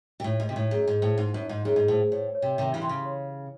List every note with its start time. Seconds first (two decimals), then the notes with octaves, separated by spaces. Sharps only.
0.20 C3
0.24 A2 D#4
0.40 G#2
0.48 C3 D#4
0.56 A2
0.71 F#2 G#4
0.88 G#2
0.94 C5
1.02 A2
1.18 G#2 D#4
1.34 F#2
1.42 D#4
1.49 G#2
1.65 F#2 G#4
1.76 G#2
1.88 A2 C5
2.12 A2 C#5
2.35 C#5
2.42 C3
2.58 C3 D#3 E5
2.74 C#3 E3
2.82 C3 C6
2.89 C#3
3.05 C#5
3.28 C#5